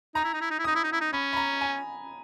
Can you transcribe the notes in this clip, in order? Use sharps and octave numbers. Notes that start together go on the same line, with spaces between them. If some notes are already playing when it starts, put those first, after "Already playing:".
D#4 A#5
E4
D#4
E4
D#4
E4
D#4 D#6
E4
D#4
E4
D#4
C#4 B5
B5
A#5
G#5